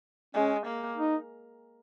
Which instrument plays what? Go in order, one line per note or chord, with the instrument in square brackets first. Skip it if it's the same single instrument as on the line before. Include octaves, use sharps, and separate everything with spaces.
[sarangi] G#3 [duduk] C#4
[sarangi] A#3
[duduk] D#4